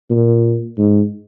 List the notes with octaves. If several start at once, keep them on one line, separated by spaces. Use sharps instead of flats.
A#2
G#2